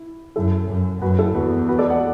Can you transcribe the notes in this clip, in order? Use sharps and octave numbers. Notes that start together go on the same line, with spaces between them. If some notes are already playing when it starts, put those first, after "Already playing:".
Already playing: E4
F#2 E4 A4
F#2
F#2 F#4 B4
E4 A4
E2 F#4 B4
F#4 B4
A4 D5
D5 F#5